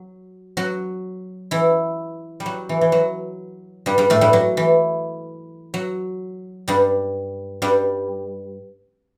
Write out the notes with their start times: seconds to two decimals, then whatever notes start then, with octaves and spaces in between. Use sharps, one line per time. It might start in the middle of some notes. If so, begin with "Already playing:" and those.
Already playing: F#3
0.57 F#3 F#4
1.51 E3 E4
2.40 G3
2.46 F#3
2.69 E3
2.81 E3
2.92 F#3
3.86 G2 G3
3.98 G2 G3
4.10 A2 A3
4.21 G2 G3
4.33 F#3
4.57 E3
5.74 F#3
6.68 G2 G3
7.62 G2 G3